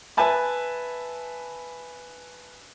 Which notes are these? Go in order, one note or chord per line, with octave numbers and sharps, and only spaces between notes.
B4 E5 G#5 A5 B5